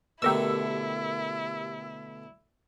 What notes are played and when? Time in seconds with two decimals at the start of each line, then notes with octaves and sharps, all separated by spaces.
0.22 B2 D3 A3 E4 G4 A#4 E6